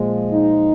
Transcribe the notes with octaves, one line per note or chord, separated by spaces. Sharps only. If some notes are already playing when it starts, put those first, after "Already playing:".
Already playing: A#2 F3 G#3
D#4